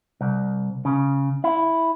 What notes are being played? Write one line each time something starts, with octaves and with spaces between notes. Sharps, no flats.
C2
C#3
E4